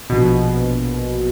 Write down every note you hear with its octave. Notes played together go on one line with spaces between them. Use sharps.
A#1 B2